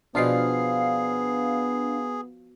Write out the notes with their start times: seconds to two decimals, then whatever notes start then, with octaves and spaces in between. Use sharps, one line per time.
0.15 B2 F3 B3 D4 F4 G#4 F5 C7